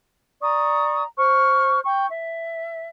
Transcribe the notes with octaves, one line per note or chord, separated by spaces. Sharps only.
D5 A#5 C#6 D#6
C5 C#6 F6
G5 C#6
E5